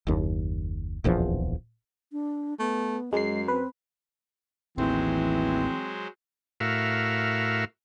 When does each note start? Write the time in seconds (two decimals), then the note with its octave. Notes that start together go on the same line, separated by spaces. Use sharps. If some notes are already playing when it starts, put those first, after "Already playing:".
0.07 F#1 D#2
1.04 D1 A#1 E2 F3
2.12 D4
2.60 A3 B3
3.13 F#2 G#3 D#5 C7
3.48 C4 B4
4.78 A1 D#2 E3 F#3 G#3 C4 C5
6.60 A2 F#4 A#4 E5 F5